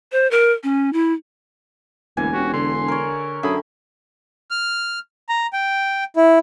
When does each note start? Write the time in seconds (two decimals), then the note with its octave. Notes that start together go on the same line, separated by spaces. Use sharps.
0.12 C5
0.31 A#4
0.63 C#4
0.93 E4
2.17 E1 D2 E3 A#3 G#5
2.33 C#4 F#4 G4
2.53 D3 C6
2.88 A#4 C#5
3.43 F#2 D3 G#4 E5 B5
4.51 F6
5.29 A#5
5.53 G5
6.16 E4